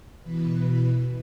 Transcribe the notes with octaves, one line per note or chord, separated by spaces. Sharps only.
B2 E3 B4